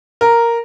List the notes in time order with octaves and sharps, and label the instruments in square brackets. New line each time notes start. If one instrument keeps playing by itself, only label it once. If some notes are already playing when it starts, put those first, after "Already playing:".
[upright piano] A#4